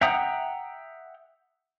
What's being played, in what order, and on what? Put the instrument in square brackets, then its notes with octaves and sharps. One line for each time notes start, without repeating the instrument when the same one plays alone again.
[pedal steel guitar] E5 F#5 G5 A#5 D#6